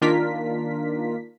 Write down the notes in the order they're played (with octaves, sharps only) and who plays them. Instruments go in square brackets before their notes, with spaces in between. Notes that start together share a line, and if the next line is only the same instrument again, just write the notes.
[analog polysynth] D#3 A#3 D4 F4 A#4 B6